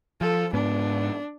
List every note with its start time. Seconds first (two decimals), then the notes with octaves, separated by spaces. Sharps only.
0.21 F3 A4
0.53 G#2 B3 D4